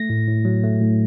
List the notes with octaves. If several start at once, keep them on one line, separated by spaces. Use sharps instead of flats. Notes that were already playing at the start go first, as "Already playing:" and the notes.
Already playing: A3 A#6
A2
A2
F#3
A3
A2